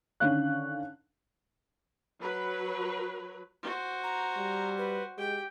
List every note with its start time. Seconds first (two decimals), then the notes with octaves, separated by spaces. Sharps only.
0.20 D3 D#3 C#4 F5 F#6
2.21 F#3 B4
3.63 F#4 C5
4.03 A#5
4.37 G3
4.78 B4
5.18 G#3 G4 G5